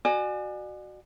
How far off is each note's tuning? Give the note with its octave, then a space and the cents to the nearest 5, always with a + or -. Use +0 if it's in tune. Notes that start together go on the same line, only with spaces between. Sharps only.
F#4 +0 D5 +40 G#5 +0